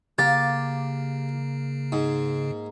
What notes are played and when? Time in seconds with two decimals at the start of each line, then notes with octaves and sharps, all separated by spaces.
0.18 C#3 A#3 G4 A6
1.92 G#2